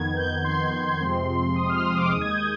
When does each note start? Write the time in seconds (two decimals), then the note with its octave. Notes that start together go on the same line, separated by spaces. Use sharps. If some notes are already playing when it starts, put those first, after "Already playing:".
Already playing: F2 D#3 B3 G#6
0.17 G6
0.44 C6
1.01 F2 C3 F3 G#3 C4
1.56 D#6
1.70 F6
1.85 D#6
1.98 D6
2.11 D#2 D#3 G#3 D#6
2.21 G#6
2.31 G6